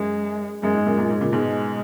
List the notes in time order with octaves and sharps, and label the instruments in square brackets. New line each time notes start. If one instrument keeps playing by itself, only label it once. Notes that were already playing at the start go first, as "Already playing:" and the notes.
Already playing: [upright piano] F#2 [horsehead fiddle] G#3
[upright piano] F#2 [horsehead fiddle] G#3
[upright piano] G#2
F#2 A#2
F#2 A#2
G#2
A#2 C#3
[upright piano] G#2 B2 [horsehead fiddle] G#3